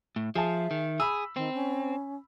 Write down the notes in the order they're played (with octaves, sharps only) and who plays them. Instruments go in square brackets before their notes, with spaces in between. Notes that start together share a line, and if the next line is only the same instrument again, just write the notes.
[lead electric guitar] A2
[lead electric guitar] F3 [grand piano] G#4 A5 [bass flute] E5
[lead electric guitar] D#3
[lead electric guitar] G#4 [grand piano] B5 E6
[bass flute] D#3 [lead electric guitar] C4
[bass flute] C#4